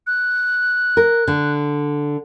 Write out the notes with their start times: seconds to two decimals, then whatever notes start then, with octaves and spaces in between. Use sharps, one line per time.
0.07 F#6
0.97 A#4
1.28 D3